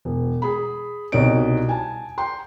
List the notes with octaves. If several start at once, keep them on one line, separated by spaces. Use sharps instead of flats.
E1
G#4 B5
C2 B2 D#4 C#5 D#5 D7
G#5 A5
G5 C6